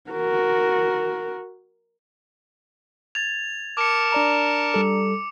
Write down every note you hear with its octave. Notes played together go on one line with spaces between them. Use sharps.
F#4 A#4
G#6 A6 F7
A#4 A5 D6 C#7
D4 D5 A#5
G3 A4